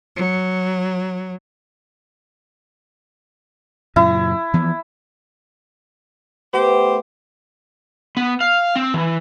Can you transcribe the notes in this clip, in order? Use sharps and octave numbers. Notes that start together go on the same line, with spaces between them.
F#3
F#2 A#2 C#3 E4
E3 F3 B3
A3 B3 G4 C5
B3
F5
C4
E3